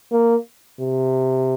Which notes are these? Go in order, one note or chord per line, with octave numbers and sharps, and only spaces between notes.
A#3
C3